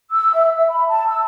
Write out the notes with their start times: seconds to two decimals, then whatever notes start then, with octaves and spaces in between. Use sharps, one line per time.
0.10 E6
0.33 E5
0.57 E5
0.69 B5
0.88 A5
1.07 E6